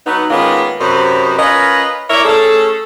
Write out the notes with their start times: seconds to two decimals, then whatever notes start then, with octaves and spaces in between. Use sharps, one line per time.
0.06 F#3 B3 D#4
0.30 D#3 G#3 A#3 B3 C#4 F4
0.81 F#2 C3 C#4 B4 C5 D#5
1.39 C#4 F4 A#4 B4 D#5
2.10 E4 A#4 C#5 D5 E5
2.25 A3 C#4 G#4 A4